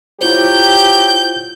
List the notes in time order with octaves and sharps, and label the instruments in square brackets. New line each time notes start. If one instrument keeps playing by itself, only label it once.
[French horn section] F#3 G4 [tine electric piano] E4 F4 C5 [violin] G6